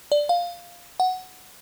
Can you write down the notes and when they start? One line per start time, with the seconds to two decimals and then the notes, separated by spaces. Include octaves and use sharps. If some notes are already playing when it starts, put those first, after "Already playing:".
0.12 D5
0.29 F5
1.00 F#5